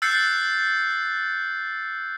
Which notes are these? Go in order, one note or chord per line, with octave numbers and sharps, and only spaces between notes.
E6 F#6 G6 A6 C7 C#7